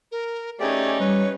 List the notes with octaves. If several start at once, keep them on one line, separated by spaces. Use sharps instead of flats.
A#4
A3 C#4 D#4 G4 G#4 D5
G3 B4 C#5